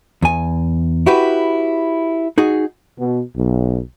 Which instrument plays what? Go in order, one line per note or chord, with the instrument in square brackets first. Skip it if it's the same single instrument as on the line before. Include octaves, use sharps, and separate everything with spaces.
[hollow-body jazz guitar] E2 G#5
E4 F#4 G4 B4
D#4 F#4 G#4
[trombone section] B2
B1